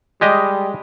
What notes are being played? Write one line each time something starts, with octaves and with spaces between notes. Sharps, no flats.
G3 G#3 G4 D#5